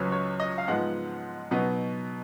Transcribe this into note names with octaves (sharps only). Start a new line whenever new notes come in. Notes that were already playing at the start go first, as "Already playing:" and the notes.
Already playing: C#2 C#3 F#3 C#4 B4
C#5
D#5
F5
G#2 F3 G#3 B3 F#5
B2 F#3 B3 D#4